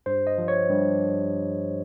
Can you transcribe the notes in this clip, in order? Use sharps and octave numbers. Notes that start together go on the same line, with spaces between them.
G2 C5
D#5
F3
C#5
G2